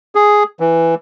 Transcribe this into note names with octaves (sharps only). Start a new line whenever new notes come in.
G#4
E3